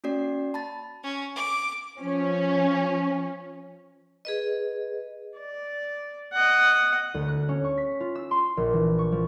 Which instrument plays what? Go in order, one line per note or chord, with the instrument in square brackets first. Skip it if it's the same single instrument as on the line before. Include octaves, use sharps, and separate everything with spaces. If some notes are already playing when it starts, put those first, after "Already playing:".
[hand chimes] A#3 C#4 F#4 D5 C7
A5 B5 A6
[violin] C#4
D6
[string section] F3 C#4
[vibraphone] G#4 B4 D#5
[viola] D5
D#5 F#5
[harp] D2
F#6
C#4
C#6
B6
F4
E6
C6
A#1
E3
C#6
F3